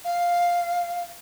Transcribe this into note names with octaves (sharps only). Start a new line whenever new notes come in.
F5